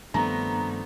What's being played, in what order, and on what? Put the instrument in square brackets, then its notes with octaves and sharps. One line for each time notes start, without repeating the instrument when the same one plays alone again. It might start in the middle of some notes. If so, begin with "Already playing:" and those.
[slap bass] G2 D#3 F3 [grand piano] A3 C4 D4 [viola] B3 [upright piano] A#5